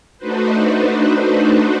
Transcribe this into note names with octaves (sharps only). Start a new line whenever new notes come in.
A3 D4 D#4 F#4 B4 C5